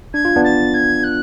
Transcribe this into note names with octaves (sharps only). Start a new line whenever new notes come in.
D4 G#6
F4
B3 D4
A6
G#6
F#6